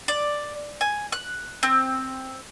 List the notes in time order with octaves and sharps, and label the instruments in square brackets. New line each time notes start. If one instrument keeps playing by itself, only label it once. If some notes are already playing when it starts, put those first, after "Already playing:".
[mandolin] D5
G#5
F#6
C4